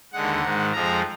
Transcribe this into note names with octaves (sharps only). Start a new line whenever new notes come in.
D#2 D3 G#3 F#5
G#2 D#3 G#3
F2 F3 G#3 A#5